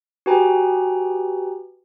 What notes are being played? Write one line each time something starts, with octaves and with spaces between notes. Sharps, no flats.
F#4 G4 B4 G5 G#5 A#5